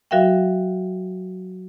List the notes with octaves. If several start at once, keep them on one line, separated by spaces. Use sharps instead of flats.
F#3 F#4 A#4 E5 F5 G5